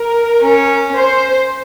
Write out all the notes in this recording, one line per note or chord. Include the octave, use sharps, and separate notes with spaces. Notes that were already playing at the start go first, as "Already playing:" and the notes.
Already playing: A#4
C#4
C5